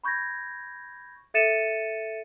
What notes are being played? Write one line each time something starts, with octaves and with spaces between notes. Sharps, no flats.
B5 C#6 G6 G#6 A#6
A4 E5 A6 C#7 D#7 E7